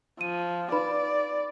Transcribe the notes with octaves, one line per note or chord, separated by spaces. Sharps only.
F3 D#7
D#4 B4 D5 B5